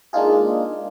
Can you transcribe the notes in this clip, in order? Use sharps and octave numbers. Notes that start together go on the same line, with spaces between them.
G#3 A#3 D4 D#4 F4 G#4